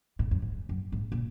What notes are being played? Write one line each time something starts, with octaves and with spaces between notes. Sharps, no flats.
G#2
F#2
G#2
F#2
G#2
A#2